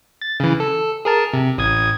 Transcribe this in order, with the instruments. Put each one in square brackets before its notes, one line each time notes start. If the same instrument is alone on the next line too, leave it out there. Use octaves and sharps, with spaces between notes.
[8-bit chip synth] A6
C#3 E3
A4
G#4 A#4 A5
C3
A1 D#6 G#6